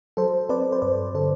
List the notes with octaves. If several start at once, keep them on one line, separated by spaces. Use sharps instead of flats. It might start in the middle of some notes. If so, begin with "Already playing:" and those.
F#3 A4 C5
C4 B4 D5
C5
G2 B4 D5
D3 A4 C5